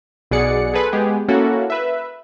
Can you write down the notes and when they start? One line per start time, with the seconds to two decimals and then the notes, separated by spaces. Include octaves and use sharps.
0.31 B1 B2 G#4 D5 F#5 C#7
0.74 G#4 A4 B4 C6
0.92 G#3 B3 G4 G#4
1.29 A#3 C#4 E4 F#4 A4
1.70 B4 E5